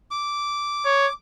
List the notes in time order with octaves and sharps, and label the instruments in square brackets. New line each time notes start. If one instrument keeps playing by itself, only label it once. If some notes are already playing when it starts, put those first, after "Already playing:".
[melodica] D6
[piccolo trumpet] C#5